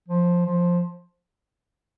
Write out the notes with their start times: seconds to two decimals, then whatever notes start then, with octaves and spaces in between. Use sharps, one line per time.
0.08 F3
0.46 F3